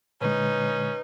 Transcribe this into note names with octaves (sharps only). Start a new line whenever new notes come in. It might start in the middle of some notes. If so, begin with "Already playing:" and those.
A#2 D3 G#3 C#4 D#4 B4